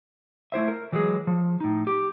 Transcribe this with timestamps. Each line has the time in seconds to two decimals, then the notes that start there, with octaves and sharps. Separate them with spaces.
0.52 A3 E4 C5 E5
0.68 A#4
0.92 E3 F#3 G#3 G4 G#4
1.27 F3
1.60 A2 D#4
1.87 G4